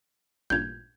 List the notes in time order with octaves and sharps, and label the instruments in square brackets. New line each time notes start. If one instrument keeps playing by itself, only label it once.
[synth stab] A1 G2 A#2 [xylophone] G6 G#6